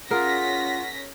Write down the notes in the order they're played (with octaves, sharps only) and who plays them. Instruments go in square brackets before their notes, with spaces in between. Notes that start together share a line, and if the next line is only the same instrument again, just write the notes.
[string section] C#4 A#6 B6 [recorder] F4 [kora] G#4 A#4 [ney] F#5